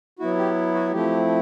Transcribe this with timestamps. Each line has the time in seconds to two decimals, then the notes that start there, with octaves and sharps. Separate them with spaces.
0.19 F#3 B3 E4 F#4
0.37 G4
0.74 F#4
0.92 F3 A3 C4 E4 G4